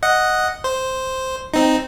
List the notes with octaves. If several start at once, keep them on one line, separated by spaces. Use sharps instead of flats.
D#5 F#5
C5
C4 D#4